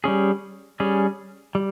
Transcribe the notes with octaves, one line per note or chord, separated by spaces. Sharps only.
G3 C#4 G#4
G3 C#4 G#4
G3